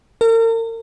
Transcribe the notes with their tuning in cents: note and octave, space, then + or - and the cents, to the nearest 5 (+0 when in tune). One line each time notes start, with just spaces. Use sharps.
A#4 -40